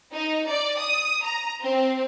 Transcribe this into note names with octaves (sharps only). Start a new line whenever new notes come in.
D#4
D5
D#6
A#5
C4